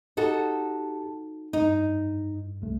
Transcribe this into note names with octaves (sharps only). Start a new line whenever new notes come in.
D#4 F#4 G4 A4 A5
G2 D#4
C2 A3